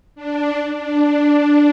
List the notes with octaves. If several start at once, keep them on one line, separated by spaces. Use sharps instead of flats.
D4
D4